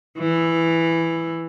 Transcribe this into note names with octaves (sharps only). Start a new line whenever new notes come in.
E3